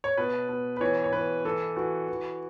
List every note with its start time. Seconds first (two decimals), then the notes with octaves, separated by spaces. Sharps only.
0.04 C#5
0.17 B2 B4
0.49 B2
0.77 B4
0.81 E3 C#5
1.04 C#5
1.13 E3 B4
1.45 E3 A4
1.76 E3 F#4
2.09 E3